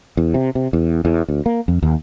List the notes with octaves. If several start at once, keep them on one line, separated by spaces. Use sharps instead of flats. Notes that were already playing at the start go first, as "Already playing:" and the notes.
E2
C3
C3
E2
E2
D2
A#3
F2
D#2